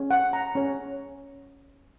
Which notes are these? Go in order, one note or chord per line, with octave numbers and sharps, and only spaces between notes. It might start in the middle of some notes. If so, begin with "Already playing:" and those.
Already playing: C#4 G#4 C#5
F#5
A#5
C#4 G#4 C#5